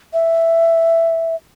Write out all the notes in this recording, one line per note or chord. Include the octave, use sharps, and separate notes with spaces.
E5